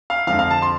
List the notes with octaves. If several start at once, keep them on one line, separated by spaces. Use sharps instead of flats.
F5
F2 D3 F3 F5
F5
A5
C6